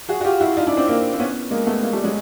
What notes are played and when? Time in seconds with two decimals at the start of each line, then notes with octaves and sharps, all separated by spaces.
0.09 F#4 G#4
0.21 F#4
0.24 F4 G4
0.40 E4 F#4
0.57 D#4 F4
0.67 D4 E4
0.77 C4 D4
0.88 A#3 C4
1.13 C4
1.19 B3 C#4
1.51 G#3 A#3
1.67 A3 B3
1.83 G#3 A#3
1.93 G3 A3
2.04 F#3 G#3